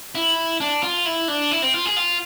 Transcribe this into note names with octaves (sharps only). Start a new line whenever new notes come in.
E4
D4
F4
E4
D4
E4
C4
F4
G#4
F4